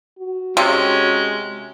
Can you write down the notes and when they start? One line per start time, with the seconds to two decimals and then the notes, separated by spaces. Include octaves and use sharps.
0.19 F#4
0.57 C3 G#3 C#4